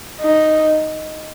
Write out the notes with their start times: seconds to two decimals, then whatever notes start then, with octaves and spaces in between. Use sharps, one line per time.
0.21 D#4